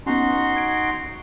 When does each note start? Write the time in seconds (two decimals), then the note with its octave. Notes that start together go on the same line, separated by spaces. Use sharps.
0.06 B3 C#4 D#4 F#4 C6
0.56 G#6 D7